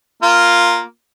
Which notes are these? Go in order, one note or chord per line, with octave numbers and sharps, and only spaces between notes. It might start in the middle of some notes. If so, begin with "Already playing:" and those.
A#3 F4